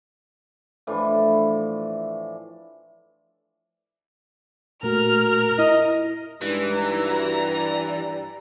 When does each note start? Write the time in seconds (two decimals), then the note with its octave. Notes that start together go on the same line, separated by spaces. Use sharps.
0.87 A2 E3 F3 D4
4.83 A#2 A3 F#4 A#4 F6
5.59 E4 D#5
6.42 G2 E3 G#3 D#4
6.74 A#5
7.06 F#4 A#5
7.37 G4 D5